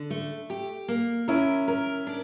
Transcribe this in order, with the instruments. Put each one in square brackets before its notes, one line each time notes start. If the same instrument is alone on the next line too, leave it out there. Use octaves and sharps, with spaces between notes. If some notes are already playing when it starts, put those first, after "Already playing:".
Already playing: [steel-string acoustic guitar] D3
A3
G4
A#3
[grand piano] C#4 E4 [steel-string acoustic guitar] A#4
[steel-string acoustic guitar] A#4
D4